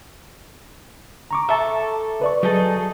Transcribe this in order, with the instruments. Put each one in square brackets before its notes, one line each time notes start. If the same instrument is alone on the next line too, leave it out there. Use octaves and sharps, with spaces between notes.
[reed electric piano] A#5 C#6 D6
[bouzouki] A4 E5
[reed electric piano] B4 D5 C#6
[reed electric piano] F#3 [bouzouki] D#4 G#4 A4